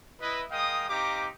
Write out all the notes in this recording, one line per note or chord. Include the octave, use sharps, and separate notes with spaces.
E4 B4 D#5
G#3 A#4 D#5 F5 G5 D#6
C4 D#4 G4 F5 A#5 D6